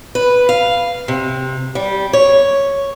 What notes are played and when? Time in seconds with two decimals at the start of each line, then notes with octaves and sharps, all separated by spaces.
0.15 B4
0.49 F5
1.08 C3
1.75 G3
2.13 C#5